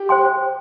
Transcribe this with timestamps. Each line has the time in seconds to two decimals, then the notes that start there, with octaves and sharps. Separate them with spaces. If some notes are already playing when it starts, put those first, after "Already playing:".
Already playing: G4
0.09 C5 G5 C6